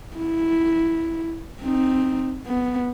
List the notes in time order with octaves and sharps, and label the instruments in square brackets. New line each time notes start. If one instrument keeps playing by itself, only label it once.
[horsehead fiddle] E4
C4 D#4
B3